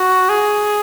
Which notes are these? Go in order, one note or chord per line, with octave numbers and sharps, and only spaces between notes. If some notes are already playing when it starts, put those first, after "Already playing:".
Already playing: F#4
G#4